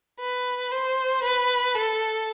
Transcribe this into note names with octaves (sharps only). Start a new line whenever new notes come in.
B4
C5
B4
A4